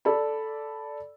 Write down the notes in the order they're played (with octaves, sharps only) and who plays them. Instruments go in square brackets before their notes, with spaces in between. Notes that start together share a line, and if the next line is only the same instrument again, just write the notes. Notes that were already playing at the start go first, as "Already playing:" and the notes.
[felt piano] A4 D5 B5